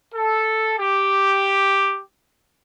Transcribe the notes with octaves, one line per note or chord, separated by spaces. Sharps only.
A4
G4